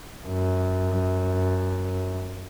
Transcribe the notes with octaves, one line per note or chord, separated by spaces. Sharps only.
F#2